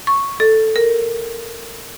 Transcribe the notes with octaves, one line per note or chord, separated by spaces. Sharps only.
C#6
A4
A#4